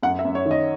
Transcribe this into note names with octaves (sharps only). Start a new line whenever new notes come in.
F#2 F#5
E5
F#2
C#5
D#3
D#5